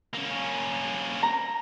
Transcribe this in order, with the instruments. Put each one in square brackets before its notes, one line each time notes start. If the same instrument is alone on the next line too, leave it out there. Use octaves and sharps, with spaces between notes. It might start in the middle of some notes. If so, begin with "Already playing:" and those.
[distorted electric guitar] A#3 C#4
[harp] A#5